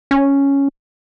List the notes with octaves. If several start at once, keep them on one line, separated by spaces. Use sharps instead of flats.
C#4